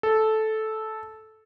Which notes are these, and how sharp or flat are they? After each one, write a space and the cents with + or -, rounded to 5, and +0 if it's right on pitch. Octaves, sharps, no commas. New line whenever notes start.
A4 -10